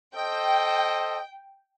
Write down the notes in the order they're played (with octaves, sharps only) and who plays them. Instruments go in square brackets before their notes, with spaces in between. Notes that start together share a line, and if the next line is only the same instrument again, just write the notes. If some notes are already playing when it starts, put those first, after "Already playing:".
[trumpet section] A4 C5 D#5 [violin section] G5